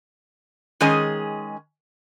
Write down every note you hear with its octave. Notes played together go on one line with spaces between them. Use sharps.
D#3 G#3 C#4 G#4 D#5 G#5